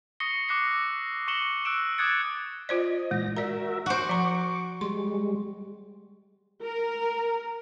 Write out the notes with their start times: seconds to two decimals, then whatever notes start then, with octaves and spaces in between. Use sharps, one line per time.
0.20 C#6 D#6 A#6 C7 C#7 G7
0.48 D6 F#6 A#6 C7 C#7
0.65 E6 A#6
1.28 C#6 A#6 C#7 E7 F#7 G7
1.65 E6 F#6 D7 E7
1.98 D6 D#6 F#6 G#6 A6 C#7
2.69 F4 C5 D5 D#5
3.11 A#2 E3 G#3 A#6
3.37 F#4 A#4 D5 E5 A#5
3.86 F#4 C5 C#6 D6
4.09 F3 A#5
4.81 G3 G#3 C6
6.63 A#4